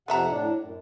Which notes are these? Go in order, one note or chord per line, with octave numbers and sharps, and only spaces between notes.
F2 C3 A3 E5 F#5 A#5
A2 D4
F#2